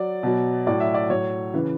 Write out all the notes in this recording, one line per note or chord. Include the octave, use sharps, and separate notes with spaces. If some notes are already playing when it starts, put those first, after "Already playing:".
Already playing: F#3 D5
B2 F#3
A2 F#3 D5
E5
D5
A2 F#3 C#5
C#3 E3 B4